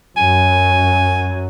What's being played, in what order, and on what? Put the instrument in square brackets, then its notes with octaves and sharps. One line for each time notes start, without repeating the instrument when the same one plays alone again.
[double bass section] F#2 F#3 [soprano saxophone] G#5